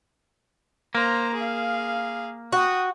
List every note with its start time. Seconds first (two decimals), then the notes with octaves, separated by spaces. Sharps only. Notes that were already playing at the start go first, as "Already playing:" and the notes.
0.95 A#3 C5 A#5
1.34 G#4 F5
2.53 F#4 G5 D#6